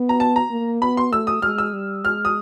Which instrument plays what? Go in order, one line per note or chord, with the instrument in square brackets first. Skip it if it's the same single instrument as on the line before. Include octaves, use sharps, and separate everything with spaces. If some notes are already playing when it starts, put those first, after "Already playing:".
Already playing: [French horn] B3
[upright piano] A#5
A5
A#5
[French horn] A#3
[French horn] B3 [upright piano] B5
[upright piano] C6
[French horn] A3 [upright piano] E6
[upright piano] D#6
[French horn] G#3 [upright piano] F6
[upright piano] E6
[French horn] G3
[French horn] G#3 [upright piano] F6
[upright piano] D#6